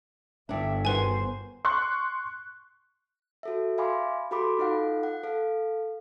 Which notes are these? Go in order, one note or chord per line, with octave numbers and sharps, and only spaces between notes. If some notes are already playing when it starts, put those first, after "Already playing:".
G1 G2 D4 E5
D#3 F#4 G#4 B4 C5 G#5
C6 C#6 F#6
F#4 A4 E5
E5 F5 G#5 B5 C6 D6
F#4 G4 A4 B5 C6 D6
D#4 F4 A4 F5 F#5
F#5
A4 F5